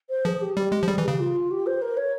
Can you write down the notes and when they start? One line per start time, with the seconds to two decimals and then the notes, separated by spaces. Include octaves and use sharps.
0.09 C5
0.25 F3 G#4
0.41 G4
0.57 G3 G4
0.72 G#3
0.83 F3
0.87 G3 G#4
0.98 E3
1.04 C#3 G4
1.19 F4
1.50 G4
1.66 C5
1.81 A#4
1.96 C#5